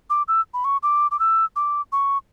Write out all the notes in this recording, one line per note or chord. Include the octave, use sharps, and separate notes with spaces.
D6
E6
B5
C#6
D6
D6
E6
D6
C#6